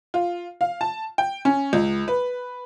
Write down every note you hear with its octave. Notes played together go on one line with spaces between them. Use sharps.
F4
F5
A5
G5
C#4
C#2
B4